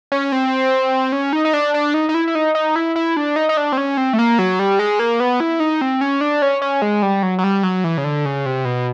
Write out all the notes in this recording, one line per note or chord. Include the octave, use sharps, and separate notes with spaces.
C#4
C4
C#4
D#4
D#4
D4
D4
D#4
D#4
E4
E4
D#4
D#4
E4
E4
D4
D#4
D#4
D4
C4
C#4
C4
A3
A#3
F#3
G3
G#3
A#3
B3
E4
D#4
C4
C#4
D4
C#4
C#4
G#3
G3
F#3
F#3
G3
F#3
E3
C#3
D3
C#3
C3
B2